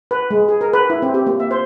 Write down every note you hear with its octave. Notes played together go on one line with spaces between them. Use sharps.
B4
G#3
G#4
A#4
B4
E4
C4
G4
A#3
E5
C5